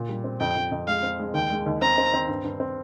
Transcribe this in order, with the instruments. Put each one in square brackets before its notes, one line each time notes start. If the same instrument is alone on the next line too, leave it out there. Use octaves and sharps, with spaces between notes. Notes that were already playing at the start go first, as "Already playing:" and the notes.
Already playing: [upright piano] A#2
G3
C4
[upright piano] F2 [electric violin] G5
[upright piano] F2
F2
[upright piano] G#3 [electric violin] F5
[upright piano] C4
G#3
[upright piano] D#2 [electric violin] G5
[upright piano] G#3
D#2
[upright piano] C4 [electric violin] A#5
[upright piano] C4
C4
G2
G2
C4